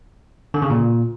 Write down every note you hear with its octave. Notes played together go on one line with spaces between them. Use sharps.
D3
C#3
A#2